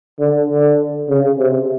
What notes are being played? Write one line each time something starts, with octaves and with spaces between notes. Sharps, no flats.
D3
D3
C#3
C3